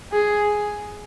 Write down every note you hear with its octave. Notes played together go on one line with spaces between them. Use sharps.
G#4